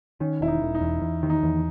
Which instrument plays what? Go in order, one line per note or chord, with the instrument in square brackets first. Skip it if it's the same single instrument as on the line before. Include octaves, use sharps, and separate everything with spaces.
[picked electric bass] D#3 [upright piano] C#4
[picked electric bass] E1 [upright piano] E4
[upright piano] D#4
[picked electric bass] E1
[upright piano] D#4
[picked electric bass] E2
E2
D#3
[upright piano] D#4
[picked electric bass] E2